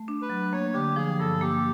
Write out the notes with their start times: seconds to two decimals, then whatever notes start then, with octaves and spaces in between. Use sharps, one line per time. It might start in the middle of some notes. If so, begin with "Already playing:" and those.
Already playing: A3
0.08 D4
0.22 B4
0.29 F#3
0.53 A#3 C#5
0.74 D3 G4
0.96 F3 G#4
1.19 G2 A4
1.41 A#3 G4